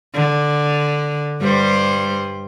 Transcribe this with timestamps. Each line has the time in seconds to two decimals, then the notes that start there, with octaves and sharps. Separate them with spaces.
0.14 D3
1.40 G2 G3 C5